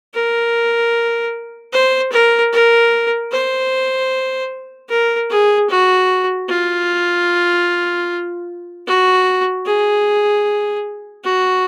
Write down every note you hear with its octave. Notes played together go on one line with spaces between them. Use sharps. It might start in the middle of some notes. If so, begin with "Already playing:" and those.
A#4
C5
A#4
A#4
C5
A#4
G#4
F#4
F4
F#4
G#4
F#4